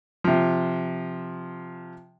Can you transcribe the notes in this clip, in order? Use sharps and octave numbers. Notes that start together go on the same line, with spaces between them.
C3 F3